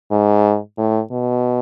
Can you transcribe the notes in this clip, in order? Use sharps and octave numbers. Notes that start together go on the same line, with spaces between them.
G#2
A2
B2